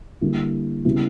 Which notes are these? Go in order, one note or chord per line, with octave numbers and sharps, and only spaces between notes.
D3 G3 A#3 E4
C#3 G3 B3 E4